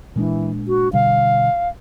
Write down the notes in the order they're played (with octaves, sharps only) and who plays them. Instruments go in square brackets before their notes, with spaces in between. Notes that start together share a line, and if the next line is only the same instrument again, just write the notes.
[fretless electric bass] A#2 G#3 D4 [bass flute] E3
[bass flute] F#4
[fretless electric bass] B2 D3 G3 [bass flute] F5